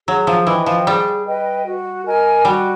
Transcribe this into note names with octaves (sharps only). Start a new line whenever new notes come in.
F#3 G#4
F3
E3 B4 D#5 G5
F3
G3 G#4
B4 D#5 G5
F#4
A#4 D#5 G#5
G3 F#4